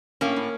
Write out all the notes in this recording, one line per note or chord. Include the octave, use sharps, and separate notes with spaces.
A2 A#3 C#4
A2